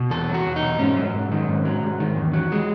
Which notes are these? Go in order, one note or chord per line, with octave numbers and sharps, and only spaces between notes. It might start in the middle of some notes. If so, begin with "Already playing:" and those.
Already playing: B2
E2 A4
F#3
F#4
E2
D#4
B2
G#2 C#4
F#3
G#2
D#3
G#2
F#3
G#2
D#3
E2
F#3
G#3